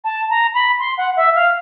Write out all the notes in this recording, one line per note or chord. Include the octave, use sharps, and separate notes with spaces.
A5
A#5
B5
C6
F#5
E5
F5